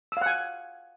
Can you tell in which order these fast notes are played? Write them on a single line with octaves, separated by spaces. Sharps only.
E6 F5 F#5 G#5